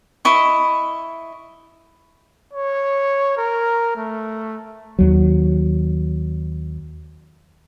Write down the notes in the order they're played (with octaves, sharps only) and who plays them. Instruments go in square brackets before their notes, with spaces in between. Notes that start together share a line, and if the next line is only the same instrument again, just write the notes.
[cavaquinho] E4 D#5 C#6
[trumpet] C#5
A#4
A3
[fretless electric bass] D#2 F#3